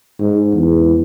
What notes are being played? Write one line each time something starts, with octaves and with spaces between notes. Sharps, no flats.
G#2
E2